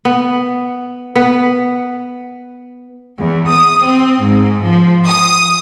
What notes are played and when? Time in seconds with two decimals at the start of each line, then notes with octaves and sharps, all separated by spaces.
0.05 B3
1.15 B3 B4
3.20 E2
3.50 D#6
3.86 C4
4.21 G#2
4.67 F3
5.06 D#6